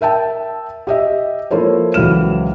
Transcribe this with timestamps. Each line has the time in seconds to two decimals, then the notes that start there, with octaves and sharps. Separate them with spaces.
0.01 A#4 E5 G5 A5
0.87 G4 D#5 E5
1.51 F3 A#3 E4 A4 C5 C#5
1.94 C#2 E3 F#3 F6 E7